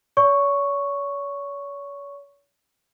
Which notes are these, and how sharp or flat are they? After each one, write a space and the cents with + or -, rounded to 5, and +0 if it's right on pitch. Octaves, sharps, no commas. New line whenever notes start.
C#5 +40 C#6 +0